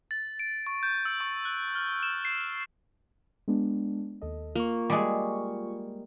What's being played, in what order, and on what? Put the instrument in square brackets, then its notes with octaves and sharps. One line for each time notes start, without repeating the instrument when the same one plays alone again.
[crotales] A6
D7
C#6
G6
E6
C#6
F#6
F6
E7
C7
[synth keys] G#3 B3 D4
D#2 A4 D#5
[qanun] A#3 [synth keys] F4 C#6
[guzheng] G3 G#3